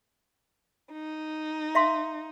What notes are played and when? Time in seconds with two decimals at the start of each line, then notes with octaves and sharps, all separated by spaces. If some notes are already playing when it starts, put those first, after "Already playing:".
0.93 D#4
1.75 E5 F5 C6